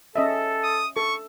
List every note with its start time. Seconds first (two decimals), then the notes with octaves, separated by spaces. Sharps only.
0.16 C#4 A4 D#5 E5
0.64 D#6
0.96 A4 C#6